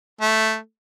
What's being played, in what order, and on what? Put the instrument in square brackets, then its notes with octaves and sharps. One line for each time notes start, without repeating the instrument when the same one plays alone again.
[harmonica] A3